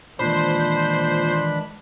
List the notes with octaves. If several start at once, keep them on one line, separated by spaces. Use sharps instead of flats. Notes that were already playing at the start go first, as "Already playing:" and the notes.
A#2 D#3 E3 G#3 D4 C5 B5